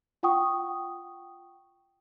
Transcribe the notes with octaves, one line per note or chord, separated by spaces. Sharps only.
F4 F#5 G5 C#6 D#6